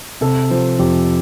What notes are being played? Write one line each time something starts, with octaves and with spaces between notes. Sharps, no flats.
C3 A4
F3 C5
F2 G4